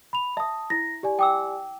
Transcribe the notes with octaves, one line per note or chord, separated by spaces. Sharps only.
B5 F7
E5 A5 D#6
E4 A#6
G4 D5 G#5
G5 D6 E6